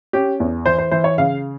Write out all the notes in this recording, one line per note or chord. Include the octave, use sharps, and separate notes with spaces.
C#4 G4
E2
E3 C5
C5
E3 C5
C#5
C#3 F5